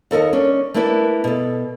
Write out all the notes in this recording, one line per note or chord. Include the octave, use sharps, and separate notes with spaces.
D#2 A4 A#4 D#5
C#4 D4
A3 A#3 D4 E4 B4
B2 A4